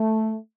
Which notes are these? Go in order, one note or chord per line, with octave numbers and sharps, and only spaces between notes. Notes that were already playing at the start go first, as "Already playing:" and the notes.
Already playing: A3